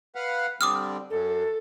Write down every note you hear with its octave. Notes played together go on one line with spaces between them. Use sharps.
B4 F5 F#5
D3 G3 C4 D6 D#6 F6
F#2 A4